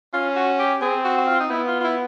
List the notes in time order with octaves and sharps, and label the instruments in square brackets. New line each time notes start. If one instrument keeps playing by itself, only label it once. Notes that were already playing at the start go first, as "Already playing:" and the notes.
[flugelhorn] C#4 [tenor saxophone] F4
[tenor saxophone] F#4
G4
[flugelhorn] C4 [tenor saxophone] G#4
[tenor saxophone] F#4
F#4
F4
D#4
[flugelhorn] B3 [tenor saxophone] E4
[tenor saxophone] F4
F4
E4